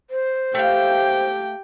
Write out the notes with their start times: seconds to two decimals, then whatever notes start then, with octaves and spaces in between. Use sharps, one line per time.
0.10 C5
0.55 A3 G4 F5 G5